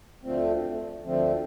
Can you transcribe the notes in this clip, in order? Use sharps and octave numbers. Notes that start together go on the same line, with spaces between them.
D2 D3 F3 A3 C4
D2 D3 F3 A3 C4